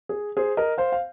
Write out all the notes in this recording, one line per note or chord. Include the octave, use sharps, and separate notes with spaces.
G#4
G#4 C5
A#4 D#5
C5 F5
F5